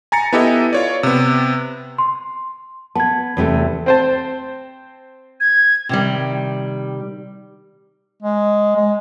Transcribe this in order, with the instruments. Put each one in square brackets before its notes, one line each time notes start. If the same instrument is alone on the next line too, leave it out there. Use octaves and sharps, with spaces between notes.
[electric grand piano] G#5 A#5 A6 C#7
B3 E4 G4 A4 D#5
F4 C#5 D5
C3 B3
[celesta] C6
[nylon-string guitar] B3 [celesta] A5 G#6
[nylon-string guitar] E2 C3 A3
[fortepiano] C4 C5 A5
[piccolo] G#6
[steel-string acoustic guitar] C3 D#3 G3
[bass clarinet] G#3
G#3